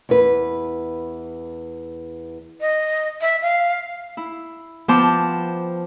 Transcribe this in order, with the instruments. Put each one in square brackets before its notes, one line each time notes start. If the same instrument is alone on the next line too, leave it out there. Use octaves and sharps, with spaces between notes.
[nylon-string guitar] E2 B4
[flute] D#5
E5
F5
[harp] E4
F3 B3 C5 G5 A5 D6